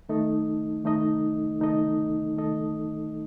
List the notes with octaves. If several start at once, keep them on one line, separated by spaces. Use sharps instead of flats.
D#3 A3 D#4 A4 D#5
D#3 A3 D#4 A4 D#5
D#3 A3 D#4 A4 D#5
D#3 A3 D#4 A4 D#5